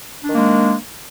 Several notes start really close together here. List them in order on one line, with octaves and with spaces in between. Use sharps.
D4 D#3 A#3 G#3